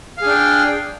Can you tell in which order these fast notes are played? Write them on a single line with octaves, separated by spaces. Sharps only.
F5 G#4 D4 G5